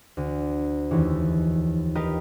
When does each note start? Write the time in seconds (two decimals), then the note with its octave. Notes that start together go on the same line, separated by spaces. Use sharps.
0.17 D2
0.91 F1 D#2 E3
1.96 G4 A#4 B4 D#5 F5